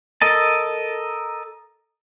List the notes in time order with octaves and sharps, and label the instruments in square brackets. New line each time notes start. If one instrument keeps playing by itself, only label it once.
[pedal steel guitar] A4 A#4 D#5 A5